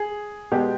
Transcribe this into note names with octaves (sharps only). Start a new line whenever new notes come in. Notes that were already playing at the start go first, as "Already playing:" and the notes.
Already playing: G#4
B2 G#3 B3 G4